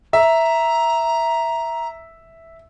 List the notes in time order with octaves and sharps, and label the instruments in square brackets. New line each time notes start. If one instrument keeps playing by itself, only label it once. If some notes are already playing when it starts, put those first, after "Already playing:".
[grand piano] E5 [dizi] A#5